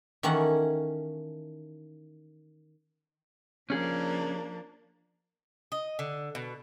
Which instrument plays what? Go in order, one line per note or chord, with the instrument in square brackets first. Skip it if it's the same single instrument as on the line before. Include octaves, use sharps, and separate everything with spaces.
[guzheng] D#3 E3 A#3 C#4 A4 F#5
[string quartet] F3 A#3 D4 [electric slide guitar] C#4 G#4
[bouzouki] D#5
D3
B2